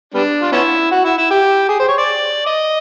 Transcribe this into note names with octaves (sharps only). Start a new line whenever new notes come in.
G3 B3 D4
F4
B3 C#4 E4
F#4
E4
E4
G4
G#4
C5
C#5
D5
D#5